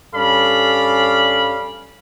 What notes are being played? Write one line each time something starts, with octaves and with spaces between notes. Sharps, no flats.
G2 C#4 A4 D5 F5 B5